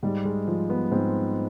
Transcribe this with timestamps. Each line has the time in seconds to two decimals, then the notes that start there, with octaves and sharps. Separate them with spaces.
0.03 G#2 G3
0.25 G#3
0.47 F3
0.70 B3
0.91 G#2 C4